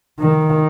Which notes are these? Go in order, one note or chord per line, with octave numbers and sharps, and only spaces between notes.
D#3